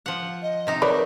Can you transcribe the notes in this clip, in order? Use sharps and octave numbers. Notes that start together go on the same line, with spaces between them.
F3 F#5
D#5
C3 D#4
F#3 A#4 B4 D5